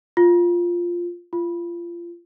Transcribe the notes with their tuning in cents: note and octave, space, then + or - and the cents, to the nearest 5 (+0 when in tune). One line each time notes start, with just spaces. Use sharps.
F4 +0
F4 -25